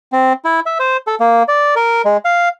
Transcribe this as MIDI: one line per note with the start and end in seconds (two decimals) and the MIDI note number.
0.12 0.33 60
0.45 0.60 64
0.66 0.78 76
0.79 0.97 72
1.07 1.15 69
1.20 1.43 58
1.48 1.75 74
1.76 2.02 70
2.05 2.17 56
2.25 2.49 77